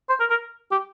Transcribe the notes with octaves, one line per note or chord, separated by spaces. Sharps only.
C5
A#4
A#4
G4